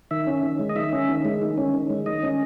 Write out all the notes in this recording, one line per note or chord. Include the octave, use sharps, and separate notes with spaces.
D#3 E5
C#4
D#3
G#3
D#5
D#3 E5
C#4
D#3
G#3
D#3
C#4
D#3
G#3
D#3 D#5
C#4